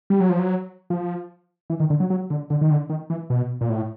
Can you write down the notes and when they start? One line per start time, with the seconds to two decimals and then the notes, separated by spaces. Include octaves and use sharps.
0.10 G3
0.20 F#3
0.30 F3
0.39 F#3
0.90 F3
1.70 E3
1.80 D#3
1.90 D3
2.00 F#3
2.10 F#3
2.30 D3
2.50 D3
2.61 D#3
2.70 D3
2.90 D#3
3.10 E3
3.30 B2
3.61 A#2
3.70 A2